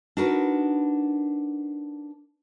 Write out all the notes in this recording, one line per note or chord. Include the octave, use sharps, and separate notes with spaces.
D4 D#4 F#4 A#4 B4